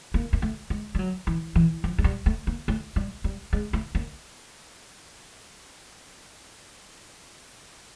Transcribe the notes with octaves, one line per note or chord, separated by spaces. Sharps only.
A#3
A#3
A3
G#3
G3
F#3
E3
E3
F3
G#3
G3
A3
A#3
A3
G3
G3
G#3
A3
A#3